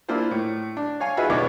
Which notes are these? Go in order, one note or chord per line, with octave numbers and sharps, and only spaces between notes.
A#3 D4 E4 F4 C5
A2
D4
C#5 F5 G#5
D#4 F4 F#4 G#4 B4 E5
E2 B2 D4 C#5 D6